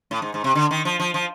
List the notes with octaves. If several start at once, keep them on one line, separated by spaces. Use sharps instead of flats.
A2
G#2
G#2
C3
D3
D#3
F3
F3
F3